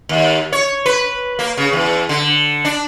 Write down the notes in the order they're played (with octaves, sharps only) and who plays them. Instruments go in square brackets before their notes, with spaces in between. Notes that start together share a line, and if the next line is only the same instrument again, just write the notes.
[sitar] D#2
C#5
B4
A#3
C#3
E2
D3
D4